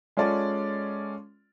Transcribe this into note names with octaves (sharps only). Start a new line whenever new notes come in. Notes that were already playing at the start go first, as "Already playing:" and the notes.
G#3 C#4 F4 A4 D5